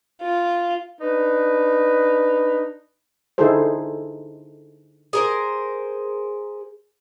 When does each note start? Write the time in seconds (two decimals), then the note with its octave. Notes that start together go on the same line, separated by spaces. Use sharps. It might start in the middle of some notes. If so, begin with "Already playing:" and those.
0.21 F4
1.00 D4 D#4 B4
3.38 D3 D#4 E4 G#4 A4 C5
5.13 G#4 A#4 C5